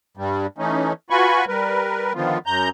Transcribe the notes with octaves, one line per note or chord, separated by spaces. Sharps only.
G2 G3
E3 A3 C#4 D#4
F4 F#4 B4 G#5 B5 C#6
G3 A#4 B4
D3 D#3 F3 B3 F4
F#2 A#5 G6